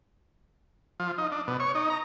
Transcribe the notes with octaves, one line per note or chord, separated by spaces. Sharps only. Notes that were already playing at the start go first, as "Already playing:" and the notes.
F3
D#4
D4
B2
C#5
D#4
A#5